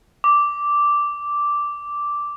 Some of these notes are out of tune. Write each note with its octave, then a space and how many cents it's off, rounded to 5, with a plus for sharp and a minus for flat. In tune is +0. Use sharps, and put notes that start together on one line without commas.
D6 -5